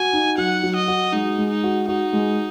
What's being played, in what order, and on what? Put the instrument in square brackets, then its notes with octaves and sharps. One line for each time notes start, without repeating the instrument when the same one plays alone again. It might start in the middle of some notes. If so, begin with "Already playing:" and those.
Already playing: [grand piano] F#4 [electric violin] G#5
[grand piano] D#4
[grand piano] F#3 [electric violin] F#5
[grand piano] F#3
[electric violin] D#5
[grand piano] F#4
[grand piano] G#3 [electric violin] D#4
[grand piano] G#3
[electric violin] D#4
[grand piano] F#4
[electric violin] D#4 [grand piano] F#4
[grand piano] G#3